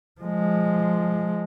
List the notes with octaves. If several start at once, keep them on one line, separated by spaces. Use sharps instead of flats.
F3 G#3